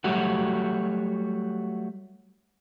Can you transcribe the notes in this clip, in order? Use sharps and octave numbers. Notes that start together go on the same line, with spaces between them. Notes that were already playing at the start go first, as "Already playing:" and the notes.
F#3 G3 A3 F#4